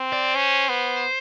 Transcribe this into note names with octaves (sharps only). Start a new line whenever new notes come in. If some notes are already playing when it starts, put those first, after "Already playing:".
Already playing: C4
D5
C#4 C5
B3